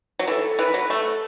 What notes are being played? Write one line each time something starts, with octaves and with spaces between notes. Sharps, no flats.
F#3
E3 A4
E3 B4
F#3
A3 A4